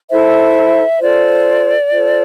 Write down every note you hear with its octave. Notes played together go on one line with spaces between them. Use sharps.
E4 A4 C5 E5
F4 A4 C5 D5
F4 A4 C5